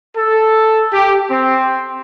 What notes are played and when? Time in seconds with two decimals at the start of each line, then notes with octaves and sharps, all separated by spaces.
0.17 A4
0.93 G4
1.31 C4